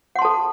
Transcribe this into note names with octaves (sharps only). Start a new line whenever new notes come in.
A4 F#5 A5 C6